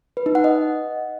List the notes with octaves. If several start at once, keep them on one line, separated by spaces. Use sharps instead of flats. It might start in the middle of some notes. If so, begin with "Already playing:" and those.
B4
D#4
F#5
D#5